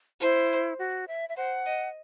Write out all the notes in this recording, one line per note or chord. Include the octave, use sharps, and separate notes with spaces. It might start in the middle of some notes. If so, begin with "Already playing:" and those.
E4 C5
F#4
E5
E5
C5 F#5
D#5